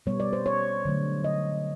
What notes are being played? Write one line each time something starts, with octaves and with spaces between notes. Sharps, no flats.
B2 G3 B3 C#5
D5
C5
C#5
D3 F#3 A3
D#5